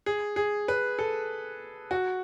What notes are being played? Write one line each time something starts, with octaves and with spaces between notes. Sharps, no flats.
G#4
G#4
B4
A4
F#4